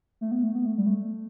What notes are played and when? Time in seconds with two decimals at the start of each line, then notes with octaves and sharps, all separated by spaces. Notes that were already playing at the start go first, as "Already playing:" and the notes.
0.21 A3
0.31 B3
0.43 A3
0.55 B3
0.66 A3
0.78 G3
0.86 A3